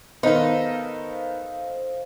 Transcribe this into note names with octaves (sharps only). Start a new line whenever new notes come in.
D#3 B3 D#4 A4 C5 F5